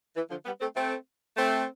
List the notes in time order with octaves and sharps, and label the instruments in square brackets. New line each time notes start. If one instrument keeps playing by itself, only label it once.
[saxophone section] E3
D3 F3
G3 B3
A3 C4
A3 C4
A3 C4